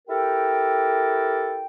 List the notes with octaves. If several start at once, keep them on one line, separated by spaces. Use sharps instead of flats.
E4 G4 A4 A#4 G5